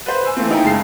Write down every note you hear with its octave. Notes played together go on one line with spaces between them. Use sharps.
B4 C5
G#5 E6
E3 A3 A#3 C4
D#4 E4 G5 G#5 A#5
F#1 C#3 G#3 A5 C7